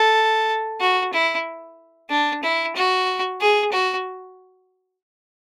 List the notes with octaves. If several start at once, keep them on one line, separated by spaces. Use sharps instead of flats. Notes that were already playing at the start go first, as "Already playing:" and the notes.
Already playing: A4
F#4
E4
D4
E4
F#4
G#4
F#4